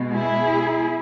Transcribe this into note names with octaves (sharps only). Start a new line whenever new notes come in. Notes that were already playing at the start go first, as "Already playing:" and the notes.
Already playing: B2 G#3
E4 G#4